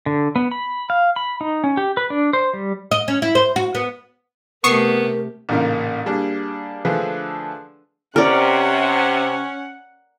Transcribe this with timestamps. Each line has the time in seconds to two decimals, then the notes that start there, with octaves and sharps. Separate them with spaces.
0.06 D3
0.36 B3
0.51 B5
0.90 F5
1.16 B5
1.41 D#4
1.64 C#4
1.77 G4
1.97 B4
2.10 D4
2.33 C5
2.53 G3
2.91 D#5
3.08 C#4
3.22 E4
3.35 C5
3.56 F#4
3.75 B3
4.64 C3 A3 B3 G4 A#4 C#6 D#6 C7
5.49 A1 A#2 C#3 A#3 D#4 A#4
6.06 G3 A#3 D4 G#4
6.85 D3 F3 A3 D4 G#4 B4
8.16 C3 C#4 A#4 D5 F#5